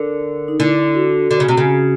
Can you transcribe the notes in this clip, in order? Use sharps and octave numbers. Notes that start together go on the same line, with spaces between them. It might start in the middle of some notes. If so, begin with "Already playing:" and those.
Already playing: D3 A#4
D#4
D3 E4
F#4
D3 F#4
C#3
C3
C#3